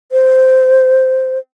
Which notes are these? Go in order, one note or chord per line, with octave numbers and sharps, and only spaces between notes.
C5